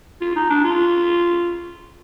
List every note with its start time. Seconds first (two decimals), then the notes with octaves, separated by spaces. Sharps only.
0.21 F4
0.36 D#4
0.50 D4
0.64 F4